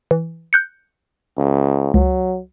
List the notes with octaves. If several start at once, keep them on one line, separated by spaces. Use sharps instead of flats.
E3
F#6 G6 C#7
C#2
C#2 F#3